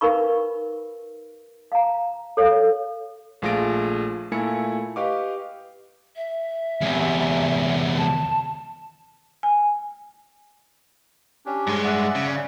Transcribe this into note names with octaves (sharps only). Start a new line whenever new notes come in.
D#4 A#4 B4 F5 B5 C#6
F5 A#5
A4 C#5 F5
A#1 A3 F4 G#4 A#6 D7
A#2 A3 E4 G#5 C#7
G4 B4 D#5 F5 C#6 D6
E5
E2 C3
A5
G#5
C#4 D4 G4
G2 G#3
D5 E5 F#5
C#3